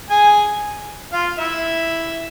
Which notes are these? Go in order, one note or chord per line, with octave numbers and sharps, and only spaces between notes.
G#4 G#5
F4 F5
E4 E5